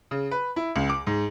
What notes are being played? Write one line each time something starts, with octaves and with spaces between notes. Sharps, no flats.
C#3
B4
E4
C#2
D6
G#2